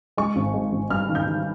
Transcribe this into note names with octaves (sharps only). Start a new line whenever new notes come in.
G#3 C#6
G#1
G#3
G#1
G2 F6
D#3
G6
D#3